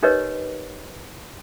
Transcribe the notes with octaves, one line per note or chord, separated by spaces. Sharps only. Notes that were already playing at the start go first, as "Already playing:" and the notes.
D#4 G4 A#4 B4 C#5 D#5